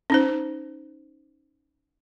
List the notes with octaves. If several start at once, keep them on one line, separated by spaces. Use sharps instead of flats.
C#4 D#4 C5